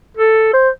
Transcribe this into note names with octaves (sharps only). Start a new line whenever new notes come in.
A4
C5